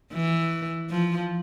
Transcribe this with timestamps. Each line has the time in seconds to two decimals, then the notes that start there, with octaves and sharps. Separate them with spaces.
0.13 E3
0.90 F3